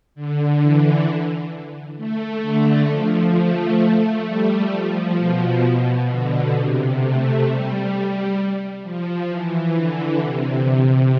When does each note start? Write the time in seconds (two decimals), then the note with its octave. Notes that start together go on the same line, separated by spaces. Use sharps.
0.15 D3
0.61 E3
1.97 A3
2.43 D3
2.89 F3
3.35 A3
3.80 A3
4.25 G3
4.71 F3
5.17 B2
5.63 B2
6.09 D3
6.54 C3
7.01 A3
7.46 G3
8.83 F3
9.29 E3
9.75 D3
10.19 C3